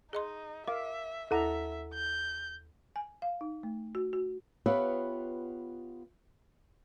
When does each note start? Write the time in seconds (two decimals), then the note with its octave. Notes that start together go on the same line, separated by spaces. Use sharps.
0.13 D#4 G#4 D#5 C6
0.68 A#4 E5 F5 D6
1.31 D#2 E4 A4 E5 F#5 A#5
1.94 G6
2.96 G#5
3.22 F5
3.41 D#4
3.63 A3
3.95 F#4
4.13 F#4
4.66 B3 F4 G4 B4 C#5 E5